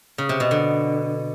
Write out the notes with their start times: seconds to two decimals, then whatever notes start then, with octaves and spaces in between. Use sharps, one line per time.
0.18 C#3
0.29 C3
0.40 B2
0.51 D3